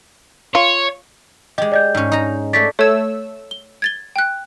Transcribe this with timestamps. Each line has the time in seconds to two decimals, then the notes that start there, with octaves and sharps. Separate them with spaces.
0.55 F4 C#5
1.58 G#3 G4 D#5
1.72 D5 D#5 G6
1.95 G#2 C#4
2.12 D#4 A#5
2.53 A3 C#5 D5 A6 B6
2.79 A3 C#5 E6 G#6
3.51 G7
3.82 G#6 A6 G7
4.16 G5 F#6